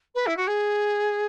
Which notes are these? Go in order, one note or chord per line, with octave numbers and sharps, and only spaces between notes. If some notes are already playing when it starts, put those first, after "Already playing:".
B4
E4
F#4
G#4